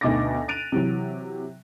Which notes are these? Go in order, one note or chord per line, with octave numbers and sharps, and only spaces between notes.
D2 B2 D#4 D6 A6 A#6
F#6 A6 D7 D#7 F7
C3 E3 F#3